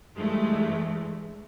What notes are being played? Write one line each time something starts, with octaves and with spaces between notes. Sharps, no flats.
G2 E3 G#3 A3